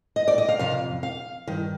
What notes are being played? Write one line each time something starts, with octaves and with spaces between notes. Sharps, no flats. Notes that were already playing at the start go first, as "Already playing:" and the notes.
D#5
D5
D#5
F5
F2 C3 F5
F5
G2 D#3